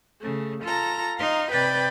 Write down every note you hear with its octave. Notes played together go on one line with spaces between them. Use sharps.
C#3 A3
F4 A4 A#5
D#4 F5 C6
C3 B4 D5 G5 B5 A6